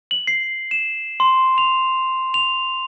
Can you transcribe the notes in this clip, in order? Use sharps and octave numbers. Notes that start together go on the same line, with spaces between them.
F#7
C7
E7
C6
F7
F7